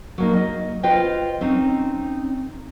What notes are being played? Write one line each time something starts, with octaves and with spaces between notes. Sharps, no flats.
F#3 A#3 D#4
D#5
F4 B4 C5 D#5 G5
C4 C#4 D#4